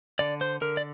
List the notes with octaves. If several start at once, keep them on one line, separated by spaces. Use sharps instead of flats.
D3 D5
C5
D3 A#4
D5